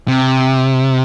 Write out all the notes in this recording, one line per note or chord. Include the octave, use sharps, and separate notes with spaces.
C3